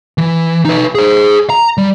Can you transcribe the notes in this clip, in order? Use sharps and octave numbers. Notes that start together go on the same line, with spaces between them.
E3
D#4 B4
G#4 C5
A#5
G3